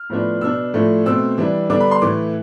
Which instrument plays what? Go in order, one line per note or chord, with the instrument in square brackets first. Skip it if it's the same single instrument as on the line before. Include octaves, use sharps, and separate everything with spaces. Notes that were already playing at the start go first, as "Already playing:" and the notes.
Already playing: [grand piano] F6
A2 F3 B3 D4
B2 B3 D4 E6
A2 F3 A3 D4
B2 A3 C4 E6
E3 G3 D4
D3 G3 B3 D4 D6
B5
C6
A2 E3 A3 D6